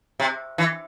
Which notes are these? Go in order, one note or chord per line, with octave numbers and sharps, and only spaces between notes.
C3
E3